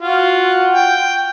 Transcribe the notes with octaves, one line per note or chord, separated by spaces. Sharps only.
F4 F#4
G5